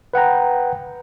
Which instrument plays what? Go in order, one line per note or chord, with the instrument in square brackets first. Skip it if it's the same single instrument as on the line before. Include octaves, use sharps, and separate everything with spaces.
[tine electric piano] B4 F#5 G5 A#5